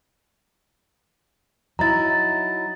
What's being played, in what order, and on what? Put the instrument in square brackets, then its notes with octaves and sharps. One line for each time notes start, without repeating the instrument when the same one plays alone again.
[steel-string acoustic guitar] F#3 D#4 E4 [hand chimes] A#5 A6